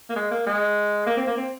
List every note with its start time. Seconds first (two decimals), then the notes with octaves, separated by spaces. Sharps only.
0.10 A#3
0.16 G#3
0.31 A#3
0.47 G#3
1.06 A#3
1.17 C4
1.27 A#3
1.37 C4